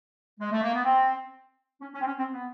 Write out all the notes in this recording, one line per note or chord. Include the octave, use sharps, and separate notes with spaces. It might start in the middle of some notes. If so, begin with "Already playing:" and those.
G#3
A3
A#3
B3
C4
C#4
C#4
C4
C#4
C4
B3